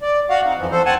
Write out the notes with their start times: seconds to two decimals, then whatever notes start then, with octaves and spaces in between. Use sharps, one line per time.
0.02 D5
0.30 F#4 F5 F#5
0.45 C4 D#4
0.58 F2 E3 F3
0.72 A4 C5
0.85 D#2 C4 F#5 G#5 A5